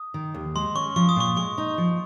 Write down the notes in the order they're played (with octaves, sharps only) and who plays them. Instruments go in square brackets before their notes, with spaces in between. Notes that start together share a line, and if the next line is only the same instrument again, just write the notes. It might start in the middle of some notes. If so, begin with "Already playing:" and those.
Already playing: [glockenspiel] D#6
[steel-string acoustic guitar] D#3
D#2
[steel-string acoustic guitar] G#3 [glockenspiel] C6
[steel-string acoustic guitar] C#4 [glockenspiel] C#6
[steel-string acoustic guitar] F3 [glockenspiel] C#6
[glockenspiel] D#6
[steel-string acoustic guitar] A#2 [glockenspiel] C#6
[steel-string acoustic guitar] G#3 [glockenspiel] C#6
[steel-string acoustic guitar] D#4
F3